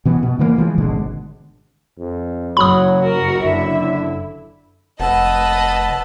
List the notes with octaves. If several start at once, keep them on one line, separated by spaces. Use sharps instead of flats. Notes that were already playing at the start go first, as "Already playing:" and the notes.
B2 E3 B3
B2
D3 E3 A#3
E3 F3 G3 G#3
G#1 B2 D3 G#3
F2
F#1 F#3 B5 D#6
F#4 A#4
F#1 D3 E4 E5
F1 B4 D#5 F#5 A5 E6